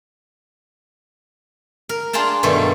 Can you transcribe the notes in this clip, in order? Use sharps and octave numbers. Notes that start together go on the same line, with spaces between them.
A#4
D4 F4 G#4 G5 A5 A#5
G2 B2 D#3 G3 A3